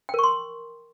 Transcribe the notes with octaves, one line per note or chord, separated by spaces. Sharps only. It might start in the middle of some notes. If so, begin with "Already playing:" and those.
A#4 G5 C6 C#6